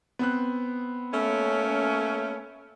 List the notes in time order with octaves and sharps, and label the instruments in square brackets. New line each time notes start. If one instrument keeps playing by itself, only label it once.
[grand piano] B3 C4 F#6
[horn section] A3 A#3 C#4